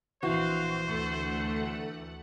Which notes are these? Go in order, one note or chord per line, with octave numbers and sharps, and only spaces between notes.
A#1 E3 C4 F#4 C5 F5
D2 A3 F#5